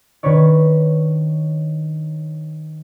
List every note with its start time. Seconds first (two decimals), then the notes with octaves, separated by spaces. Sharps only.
0.23 D#3 D4 B4 C#5 D5